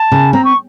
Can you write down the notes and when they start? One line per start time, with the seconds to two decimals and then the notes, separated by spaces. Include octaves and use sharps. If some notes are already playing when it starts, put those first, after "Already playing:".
Already playing: A5
0.12 C#3
0.33 C4 A#5
0.45 C#6